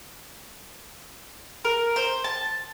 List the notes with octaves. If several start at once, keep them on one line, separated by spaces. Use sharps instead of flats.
A#4
C5
A5